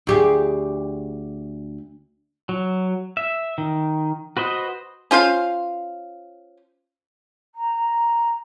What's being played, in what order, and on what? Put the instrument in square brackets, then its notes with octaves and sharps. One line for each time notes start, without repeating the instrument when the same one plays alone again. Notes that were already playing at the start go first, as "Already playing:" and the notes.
[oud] D2 G4 G#4
[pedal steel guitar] F#3
E5
D#3
F#4 B4 C5 D#5
[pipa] C#4 F4 C5 F5
[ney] A#5